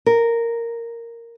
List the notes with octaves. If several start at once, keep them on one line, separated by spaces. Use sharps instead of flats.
A#4